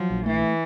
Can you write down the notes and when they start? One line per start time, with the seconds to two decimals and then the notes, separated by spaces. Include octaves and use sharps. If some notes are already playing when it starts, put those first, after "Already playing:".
Already playing: F3 F#3
0.10 A#1
0.26 E3 A3